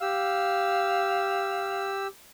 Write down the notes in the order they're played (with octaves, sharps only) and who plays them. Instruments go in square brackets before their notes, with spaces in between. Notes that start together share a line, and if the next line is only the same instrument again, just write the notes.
[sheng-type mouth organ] G4 E6 [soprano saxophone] F5